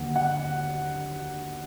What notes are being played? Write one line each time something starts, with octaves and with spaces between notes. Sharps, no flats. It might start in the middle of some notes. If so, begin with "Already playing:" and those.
Already playing: D#2 D3 F#3 A#3 F#5
F#5